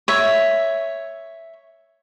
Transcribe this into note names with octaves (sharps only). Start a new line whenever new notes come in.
C#5 E5